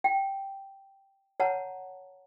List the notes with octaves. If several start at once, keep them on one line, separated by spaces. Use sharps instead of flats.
G5
C#5 F#5 A5 A#5